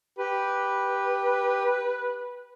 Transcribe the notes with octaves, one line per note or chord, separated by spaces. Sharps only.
G4 B4